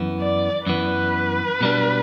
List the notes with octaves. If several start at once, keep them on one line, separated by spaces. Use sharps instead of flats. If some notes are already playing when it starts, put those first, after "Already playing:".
Already playing: F#2 E3 B3
D5
F#2 E3 B3 B4
B2 G3 D4